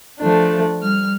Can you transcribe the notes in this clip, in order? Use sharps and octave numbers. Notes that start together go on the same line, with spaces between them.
F3 A3 D4
G3 F6